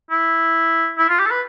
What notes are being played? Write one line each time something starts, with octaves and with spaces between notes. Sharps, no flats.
E4
E4
F4
G4
A4
B4